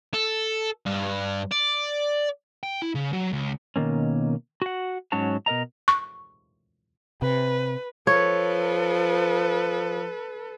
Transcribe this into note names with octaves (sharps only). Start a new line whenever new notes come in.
A4
G2
D5
G5
E4
C#3
F#3
C#2
B2 D#3 A#3 C#4
F#4 F#5
G#2 F#3 C#4 F#4 C#5 A5
B2 A#4 D#5 A#5
C#6
C3 B4
F3 A4 B4 C#5